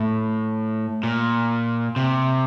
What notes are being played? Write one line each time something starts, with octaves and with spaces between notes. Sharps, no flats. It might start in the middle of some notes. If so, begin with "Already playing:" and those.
Already playing: A2
A#2
C3